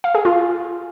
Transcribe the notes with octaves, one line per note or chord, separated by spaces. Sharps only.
F5
G#4
F4